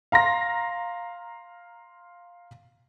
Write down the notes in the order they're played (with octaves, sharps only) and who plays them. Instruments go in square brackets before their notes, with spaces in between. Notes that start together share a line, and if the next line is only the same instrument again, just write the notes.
[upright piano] F5 A#5 C6 A#6